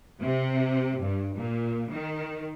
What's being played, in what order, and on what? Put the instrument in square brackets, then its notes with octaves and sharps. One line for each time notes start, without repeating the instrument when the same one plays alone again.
[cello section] C3
G2
A#2
D#3